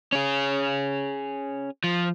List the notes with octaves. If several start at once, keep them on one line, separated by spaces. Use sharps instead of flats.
C#4 G#4
F3